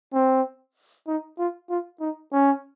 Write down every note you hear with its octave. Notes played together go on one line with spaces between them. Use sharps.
C4
D#4
F4
F4
D#4
C#4